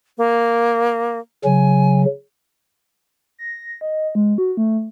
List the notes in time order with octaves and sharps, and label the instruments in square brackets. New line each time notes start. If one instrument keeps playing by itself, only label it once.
[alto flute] A#3
[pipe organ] C#3 F#3 [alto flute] G#5
[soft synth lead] A#6
D#5
G#3
F#4
A3